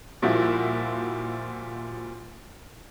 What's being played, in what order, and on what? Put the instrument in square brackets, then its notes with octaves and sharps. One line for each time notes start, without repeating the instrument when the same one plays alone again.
[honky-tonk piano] A#2 F3 G3 E4 F#4